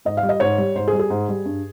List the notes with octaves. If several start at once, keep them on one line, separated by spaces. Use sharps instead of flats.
G#2 D#5
F5
G3
D#5
G#2 C#5
G3
G#2 C5
G#4
G3
G#4
G#2
G3
G2